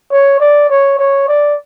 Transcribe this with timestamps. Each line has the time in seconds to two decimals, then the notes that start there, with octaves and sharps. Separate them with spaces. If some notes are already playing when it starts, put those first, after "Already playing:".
0.11 C#5
0.40 D5
0.70 C#5
0.99 C#5
1.28 D5